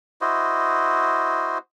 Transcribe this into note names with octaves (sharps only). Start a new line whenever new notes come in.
E4 F#4 C5 D#5